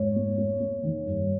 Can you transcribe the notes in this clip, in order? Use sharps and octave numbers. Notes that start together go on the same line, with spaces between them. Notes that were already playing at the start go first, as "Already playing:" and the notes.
Already playing: G#2 C#5
A#3
A#3
A#3
D#3
G2